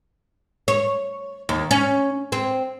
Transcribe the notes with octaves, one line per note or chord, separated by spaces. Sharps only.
C#5
D#2
C#4
C4